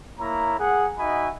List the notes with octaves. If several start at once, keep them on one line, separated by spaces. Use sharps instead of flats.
A#3 E4 C#5 A#5
G#4 F#5
D#4 F#4 D#5 E5 G#5 B5